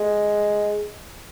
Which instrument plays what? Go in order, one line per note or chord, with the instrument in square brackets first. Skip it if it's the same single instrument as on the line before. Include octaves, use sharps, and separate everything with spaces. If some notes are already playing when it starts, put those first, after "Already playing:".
Already playing: [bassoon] G#3